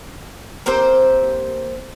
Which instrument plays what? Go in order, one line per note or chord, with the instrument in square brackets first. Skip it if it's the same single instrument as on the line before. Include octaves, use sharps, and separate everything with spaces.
[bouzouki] A#3 C4 G4 C5